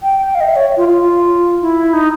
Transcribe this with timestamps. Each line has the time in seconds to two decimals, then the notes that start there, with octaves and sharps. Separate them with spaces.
0.03 G5
0.20 G5
0.35 F5
0.41 D#5
0.45 E5
0.56 C#5
0.77 F4
0.88 F4
1.62 E4
1.93 D#4